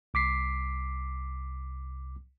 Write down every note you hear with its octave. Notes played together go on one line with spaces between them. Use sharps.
C2 D6 B6 C7